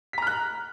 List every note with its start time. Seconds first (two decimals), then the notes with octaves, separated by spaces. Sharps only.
0.13 B6
0.18 A#5
0.22 F6
0.27 F#6